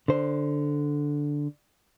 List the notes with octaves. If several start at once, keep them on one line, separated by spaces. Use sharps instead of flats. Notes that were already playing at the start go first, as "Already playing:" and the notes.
D3 C5